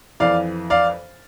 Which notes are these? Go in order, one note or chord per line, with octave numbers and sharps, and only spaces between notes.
F2 E3 D5 F5
D5 F5